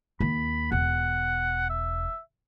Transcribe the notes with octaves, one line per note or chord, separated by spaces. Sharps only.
D#2 D#3 B5
E1 F#5
E5